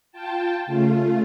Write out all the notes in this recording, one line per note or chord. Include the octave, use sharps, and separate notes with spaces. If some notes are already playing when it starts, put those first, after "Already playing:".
F4 G5 A5
C#3 A3 F4